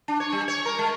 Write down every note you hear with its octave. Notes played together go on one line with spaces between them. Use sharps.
D4
C#5
G3
C#5
A#4
G#3